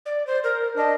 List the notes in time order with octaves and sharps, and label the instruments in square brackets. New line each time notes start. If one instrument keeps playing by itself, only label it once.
[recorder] D5
C5
A#4
[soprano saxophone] D4 [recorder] D#5